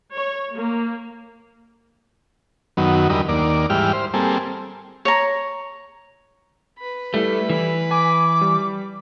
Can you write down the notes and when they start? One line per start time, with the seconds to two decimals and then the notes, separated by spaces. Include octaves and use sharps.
0.11 C#5
0.54 A#3
2.77 F#2 D#3 F#3 B3
3.10 E2 D3 G3 A#4 D#5 B5
3.29 D#2 A#3 D5
3.70 G#2 E3 G3 G4 F6
3.93 C5
4.14 G3 A#3 C4 G#4 A4
5.05 C#5 A#5
6.79 B4 B5
7.14 G3 A3 E4
7.50 E3
7.91 G#5 D6
8.41 G3